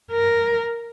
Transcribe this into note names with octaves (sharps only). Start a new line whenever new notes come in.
A#4